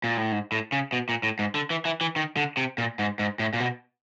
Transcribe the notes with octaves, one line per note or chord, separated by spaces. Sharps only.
A#2
A2
G#2
A2
C#3
B2
A#2
A2
G#2
D3
E3
E3
E3
D#3
D3
C3
A#2
G#2
G#2
A2
A#2
B2